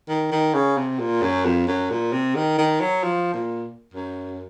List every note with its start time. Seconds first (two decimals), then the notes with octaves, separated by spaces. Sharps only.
0.09 D#3
0.32 D#3
0.54 C#3
0.77 C3
0.99 A#2
1.22 F#2
1.45 F2
1.67 F#2
1.90 A#2
2.13 C3
2.35 D#3
2.58 D#3
2.81 F#3
3.04 F3
3.34 A#2
3.94 F#2